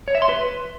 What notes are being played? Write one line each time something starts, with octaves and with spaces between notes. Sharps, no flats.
C#5
E5
C6
B4